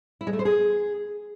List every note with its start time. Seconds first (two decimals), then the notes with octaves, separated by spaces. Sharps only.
0.21 E4
0.27 G#3
0.33 A3
0.39 C5
0.45 G#4